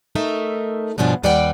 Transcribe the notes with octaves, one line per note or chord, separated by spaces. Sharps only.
A3 D#4 A#4 E5
G2 B2 F3 C#4 D4 F4
D#2 G3 B4 D5 F#5 G5